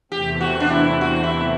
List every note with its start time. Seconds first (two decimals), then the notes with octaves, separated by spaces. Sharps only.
0.11 E2 C3 E3 A3 C4 G4
0.41 F#4
0.60 D4
0.70 E4
1.01 F#4
1.23 E4